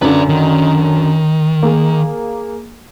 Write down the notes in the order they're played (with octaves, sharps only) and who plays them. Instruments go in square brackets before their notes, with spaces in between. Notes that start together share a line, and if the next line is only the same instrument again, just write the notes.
[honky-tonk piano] F#2 D3 [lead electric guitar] B4 D5
[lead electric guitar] D#3
[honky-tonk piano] A#3 G#4